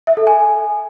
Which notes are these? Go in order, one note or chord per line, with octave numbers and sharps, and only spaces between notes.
E5
A4
G#5